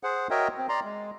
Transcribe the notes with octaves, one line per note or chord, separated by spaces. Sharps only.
G#4 C5 F#5
F#4 A#4 C#5 D#5 E5 G5
C4
D5 A#5 C6
G#3